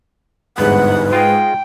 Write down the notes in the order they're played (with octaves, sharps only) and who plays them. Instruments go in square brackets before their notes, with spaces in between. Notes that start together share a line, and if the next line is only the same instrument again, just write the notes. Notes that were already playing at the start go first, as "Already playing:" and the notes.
[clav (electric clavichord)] G1 E2 B3 [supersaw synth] G#2 [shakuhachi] B4 [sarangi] F#5
[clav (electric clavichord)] F4 G#4 D#5 [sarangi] G5